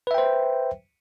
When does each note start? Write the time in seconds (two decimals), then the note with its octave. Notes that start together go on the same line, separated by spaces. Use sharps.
0.07 B4
0.11 E5
0.14 G5
0.18 C5